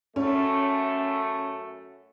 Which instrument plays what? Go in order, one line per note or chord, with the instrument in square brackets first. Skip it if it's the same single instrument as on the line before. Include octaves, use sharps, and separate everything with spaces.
[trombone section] F#2 A3 [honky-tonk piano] C#4